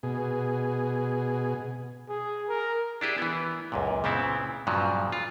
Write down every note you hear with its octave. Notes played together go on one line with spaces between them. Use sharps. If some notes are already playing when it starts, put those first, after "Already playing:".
B2 G#4
G#4
A#4
D4 E4 G4 G#4
E3 B3
C#2 F#2 A#2
A#2 C#3 B3 C4 E4
G2 A#2 C#3 F3 F#3
F4